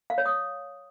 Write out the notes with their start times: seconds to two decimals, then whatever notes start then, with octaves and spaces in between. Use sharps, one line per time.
0.10 F5
0.18 C#5
0.26 D#6